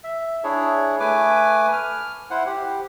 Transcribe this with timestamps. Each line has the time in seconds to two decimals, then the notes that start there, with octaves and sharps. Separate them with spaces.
0.04 E5
0.44 D4 E4 G#4 C#5
1.00 A3 B4 G#5 D6
1.72 F6
2.30 E4 C5 F#5
2.46 G4